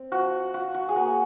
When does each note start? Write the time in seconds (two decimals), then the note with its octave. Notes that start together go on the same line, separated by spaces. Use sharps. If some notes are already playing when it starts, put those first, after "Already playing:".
Already playing: C4
0.12 F3 F#4
0.54 F4 F#4
0.74 F#4
0.89 G#4
0.96 A#3 F#4